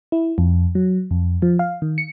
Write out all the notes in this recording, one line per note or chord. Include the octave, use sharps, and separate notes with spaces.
E4
F2
F#3
F2
F3
F5
D#3
C#7